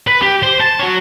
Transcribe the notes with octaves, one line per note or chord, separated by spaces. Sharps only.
B4
G4
C5
A5
F#4 C#5